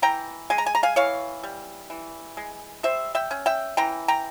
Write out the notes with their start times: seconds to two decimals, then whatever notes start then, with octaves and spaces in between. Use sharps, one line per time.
0.02 E3 G5 A#5
0.50 G#3 G#5
0.58 A#5
0.66 G#5
0.75 A#5
0.83 F5 G#5
0.96 E3 C#5 F5
1.43 G3
1.90 E3
2.37 G#3
2.83 G3 C5 E5
3.15 E5 G5
3.31 C#4
3.46 E5 G5
3.77 E3 G5 A#5
4.08 G5 A#5